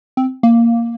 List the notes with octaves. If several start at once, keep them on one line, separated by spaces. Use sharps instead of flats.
C4
A#3